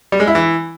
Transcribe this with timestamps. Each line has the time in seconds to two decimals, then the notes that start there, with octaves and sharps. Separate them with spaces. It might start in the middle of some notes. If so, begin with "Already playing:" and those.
0.12 G3
0.20 G#3
0.27 E4
0.35 E3